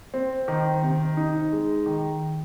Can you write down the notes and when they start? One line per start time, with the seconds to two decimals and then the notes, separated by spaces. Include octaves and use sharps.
0.14 C4
0.48 D#3
0.83 C3
1.17 D#4
1.52 G#3
1.86 D#3